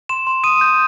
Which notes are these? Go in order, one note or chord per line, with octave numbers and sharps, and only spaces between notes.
C6 E7
C6
D#6 D#7
G6